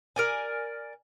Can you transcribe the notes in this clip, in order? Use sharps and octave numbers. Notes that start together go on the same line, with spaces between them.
A#4 D5 G#5